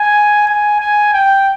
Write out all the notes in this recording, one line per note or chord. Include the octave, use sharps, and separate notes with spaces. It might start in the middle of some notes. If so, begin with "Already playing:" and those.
Already playing: G#5
G#5
G#5
G5